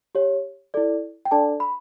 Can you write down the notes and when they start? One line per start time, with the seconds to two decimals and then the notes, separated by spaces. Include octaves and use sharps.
0.15 G4 C#5
0.74 E4 A4 D5
1.25 G5
1.31 D4 A4 D5 A5
1.60 B5